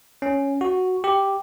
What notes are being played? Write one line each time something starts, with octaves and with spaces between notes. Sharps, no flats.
C#4
F#4
G4